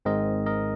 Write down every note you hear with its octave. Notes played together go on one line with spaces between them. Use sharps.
G#1 G#2 G#3 C4 A#4 D#5
A#4 D#5